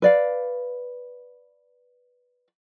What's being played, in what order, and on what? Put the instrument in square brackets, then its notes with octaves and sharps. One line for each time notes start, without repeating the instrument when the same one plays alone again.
[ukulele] B4 D5 F5